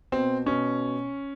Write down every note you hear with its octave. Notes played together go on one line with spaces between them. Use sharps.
B2 C4
B2 C#4